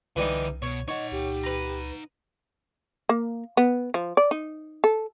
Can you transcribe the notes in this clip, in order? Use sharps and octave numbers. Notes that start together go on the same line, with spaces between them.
C2 D3 E3 G3 D#4
B2 C#5
D#4 C#5 D#5 F#5
C#2 G4
B4 A#5
A#3
B3
F3
D5
D#4
A4